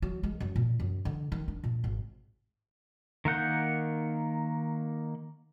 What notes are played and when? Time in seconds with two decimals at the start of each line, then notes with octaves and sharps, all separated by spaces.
0.02 F#3
0.23 G#3
0.40 F#2
0.56 A#2
0.80 F#2
1.05 D3
1.32 D#3
1.48 D4
1.64 A#2
1.84 G#1
3.25 D#3 A#3 F#5 G6